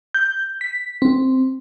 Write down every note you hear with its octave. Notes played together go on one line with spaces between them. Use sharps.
G6
B6
C4